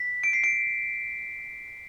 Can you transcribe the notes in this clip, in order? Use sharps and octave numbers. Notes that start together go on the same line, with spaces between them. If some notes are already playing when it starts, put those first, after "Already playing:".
Already playing: B6
D7
C7
D7